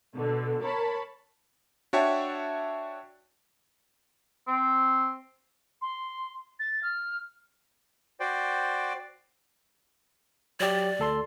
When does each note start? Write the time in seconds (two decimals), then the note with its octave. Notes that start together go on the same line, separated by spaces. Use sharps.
0.15 B2 D3
0.63 A#4 C#5 A5 B5
1.93 D4 F#4 C#5 E5 G5 A5
4.47 C4
5.82 C6
6.60 A6
6.83 F6
8.20 F#4 C5 D5 G5
10.60 F#3 G4 D5
10.99 D2 A4 C6